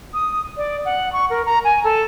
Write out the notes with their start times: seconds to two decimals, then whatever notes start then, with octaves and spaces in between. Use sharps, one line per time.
0.14 D#6
0.57 D5
0.85 F#5
1.13 C#6
1.30 A#4
1.46 A#5
1.64 G#5
1.84 A4